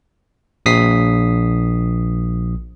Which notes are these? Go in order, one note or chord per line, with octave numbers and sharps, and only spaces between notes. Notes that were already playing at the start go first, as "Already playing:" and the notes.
A#1 D#6 B6 C7